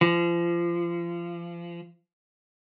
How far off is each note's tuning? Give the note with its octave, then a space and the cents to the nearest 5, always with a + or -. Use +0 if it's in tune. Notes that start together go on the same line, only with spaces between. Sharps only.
F3 -30